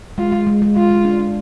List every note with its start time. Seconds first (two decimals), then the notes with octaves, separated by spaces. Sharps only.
0.18 G#3 F4
0.32 G#3
0.47 G#3
0.62 G#3
0.76 G#3 F4
0.91 G#3
1.05 D4
1.19 D4